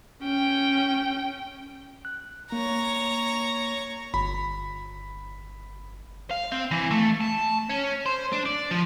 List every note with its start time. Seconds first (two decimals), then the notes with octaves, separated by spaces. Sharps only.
0.22 C#4 G5
2.05 F#6
2.52 A#3 C#5 A#5
4.14 G1 B5
6.31 F5
6.52 C4
6.71 E3
6.91 A3
7.21 A5
7.69 C#4
8.06 C5
8.33 D4
8.46 D5
8.71 F3